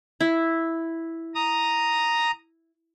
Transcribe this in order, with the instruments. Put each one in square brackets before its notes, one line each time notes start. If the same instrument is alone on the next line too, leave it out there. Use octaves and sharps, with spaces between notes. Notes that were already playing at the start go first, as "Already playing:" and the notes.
[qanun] E4
[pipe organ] A#5 D#6